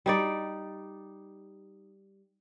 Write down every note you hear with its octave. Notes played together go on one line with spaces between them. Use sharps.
G3 D#4 D5